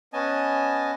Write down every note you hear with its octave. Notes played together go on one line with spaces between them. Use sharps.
B3 C#4 D#5 G#5 A5